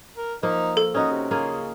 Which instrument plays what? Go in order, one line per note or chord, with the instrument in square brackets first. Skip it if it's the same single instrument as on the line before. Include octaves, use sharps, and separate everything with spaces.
[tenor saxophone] A#4
[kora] F3 A#3 [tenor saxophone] D#4
[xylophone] A4
[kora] C#4 D#4 F#4 [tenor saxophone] D#5
[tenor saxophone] C3
[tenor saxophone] C#3 [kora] A#3 F4 G#4